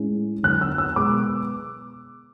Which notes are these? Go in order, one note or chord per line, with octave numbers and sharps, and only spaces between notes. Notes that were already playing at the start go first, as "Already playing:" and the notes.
Already playing: A2 G#3 C#4
D3 F#3 B3 F#6
E6
E6
B2 G#3 B3 D6